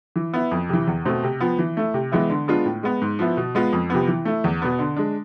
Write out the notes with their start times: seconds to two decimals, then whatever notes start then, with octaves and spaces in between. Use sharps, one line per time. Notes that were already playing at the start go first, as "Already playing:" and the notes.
0.16 E3
0.33 B3 E4
0.51 F2
0.69 C3 E3
0.87 E2
1.05 B2 A3 C4
1.24 C3
1.40 F3 B3
1.59 E3
1.77 A3 E4
1.94 C3
2.12 E3 G#3 B3 E4
2.29 D3
2.48 G#3 B3 D4 F4
2.65 A2
2.83 G#3 B3
3.02 G#2
3.19 F3 B3 E4
3.37 B2
3.55 G#3 B3 F4
3.73 F2
3.90 C3 F3 B3
4.08 E3
4.25 A3 E4
4.44 E2
4.62 B2 B3
4.79 D3
4.96 G#3 D4